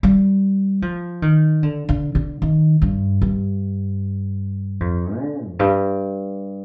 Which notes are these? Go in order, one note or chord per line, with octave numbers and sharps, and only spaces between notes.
G3
F3
D#3
D3
D3
D3
D#3
G2
G2
F2
D3
F2
G2